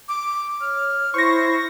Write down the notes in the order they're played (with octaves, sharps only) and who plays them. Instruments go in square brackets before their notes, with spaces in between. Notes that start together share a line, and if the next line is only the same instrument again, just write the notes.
[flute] D6
[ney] C#5 [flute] F6
[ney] E4 [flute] C5 [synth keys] C#6 A#6